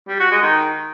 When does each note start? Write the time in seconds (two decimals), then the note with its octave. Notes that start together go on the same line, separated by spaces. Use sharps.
0.08 G3
0.20 F#4
0.31 G#3
0.43 D#3